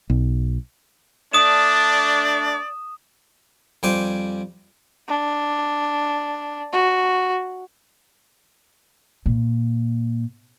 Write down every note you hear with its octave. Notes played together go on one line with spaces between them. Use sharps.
B1
A3 D4 D5 D#6 E7
F2 G3 C5 G5 G#5 D6
D4
F#4
A#2